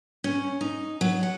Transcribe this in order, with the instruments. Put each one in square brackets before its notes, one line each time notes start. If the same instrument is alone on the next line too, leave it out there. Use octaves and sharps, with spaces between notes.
[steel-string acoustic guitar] C#4
D#4
F#3
F#5